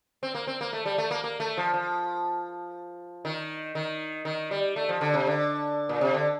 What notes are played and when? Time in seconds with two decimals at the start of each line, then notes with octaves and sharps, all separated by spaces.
0.23 C4
0.35 A#3
0.47 C4
0.61 A#3
0.73 A3
0.86 G3
0.98 A3
1.11 A#3
1.24 A#3
1.40 A3
1.57 F3
1.74 F3
3.25 D#3
3.75 D#3
4.25 D#3
4.51 G3
4.76 A3
4.89 F3
5.01 D3
5.14 C3
5.27 D3
5.89 A#2
6.01 C3
6.14 D3